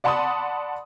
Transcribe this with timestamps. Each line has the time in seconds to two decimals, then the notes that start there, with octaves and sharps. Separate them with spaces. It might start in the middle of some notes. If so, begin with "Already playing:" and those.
0.04 D5 F#5 A5 B5 C6 D#6